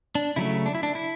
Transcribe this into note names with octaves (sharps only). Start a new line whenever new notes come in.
D4
C#3 F#3 A3 E4
D4
E4
D4
E4